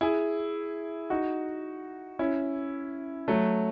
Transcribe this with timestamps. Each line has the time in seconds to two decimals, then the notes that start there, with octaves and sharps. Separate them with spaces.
0.01 E4 G#4
1.10 D#4 F#4
2.19 C#4 E4
3.28 F#3 A3